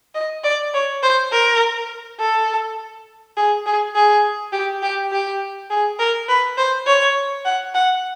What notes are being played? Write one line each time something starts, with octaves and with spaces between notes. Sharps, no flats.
D#5
D5
C#5
C5
A#4
A4
G#4
G#4
G#4
G4
G4
G4
G#4
A#4
B4
C5
C#5
F#5
F#5